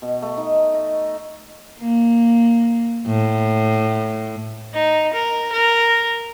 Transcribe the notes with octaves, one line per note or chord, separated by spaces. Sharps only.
B2
A3
D#4
D#5
A#3
A2
D#4
A#4
A#4